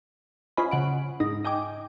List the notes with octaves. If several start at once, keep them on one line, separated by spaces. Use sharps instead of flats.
C#4 F4 C5 D#5 G#5 B5
C#3 F#5 D7
G#2 D#4
D#5 G5 G#5 D6